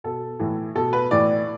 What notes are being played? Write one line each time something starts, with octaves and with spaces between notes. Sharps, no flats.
B2 A4
A2 E3
B2 A4
B4
A2 E3 D5